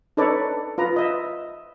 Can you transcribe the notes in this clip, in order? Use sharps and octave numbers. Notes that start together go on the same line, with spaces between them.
D#4 A4 B4 C#5 D5
F4 B4 A#5
D#5 E5